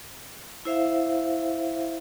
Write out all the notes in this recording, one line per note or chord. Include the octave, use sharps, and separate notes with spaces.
E4 C5 E5 F5